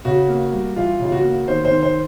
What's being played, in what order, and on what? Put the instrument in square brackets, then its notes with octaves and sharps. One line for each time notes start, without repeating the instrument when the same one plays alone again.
[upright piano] C#3 F#4
A#3
G3
E3 F4
C#3
F4
F#4
A#3
D#3 C5
C5
D#3
C5